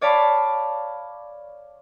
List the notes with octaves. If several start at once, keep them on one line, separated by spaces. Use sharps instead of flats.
C#5 D5 F5 A5 B5 D6